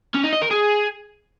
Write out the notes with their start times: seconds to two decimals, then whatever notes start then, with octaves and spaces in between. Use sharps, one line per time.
0.15 C#4
0.24 D#4
0.33 D#5
0.42 A#4
0.51 G#4